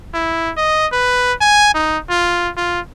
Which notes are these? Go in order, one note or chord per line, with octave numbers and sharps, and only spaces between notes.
E4
D#5
B4
G#5
D#4
F4
F4